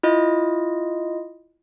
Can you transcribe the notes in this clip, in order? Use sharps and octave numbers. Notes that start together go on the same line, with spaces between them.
E4 F4 D#5